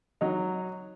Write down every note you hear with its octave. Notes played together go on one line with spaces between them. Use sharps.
F#3 D#4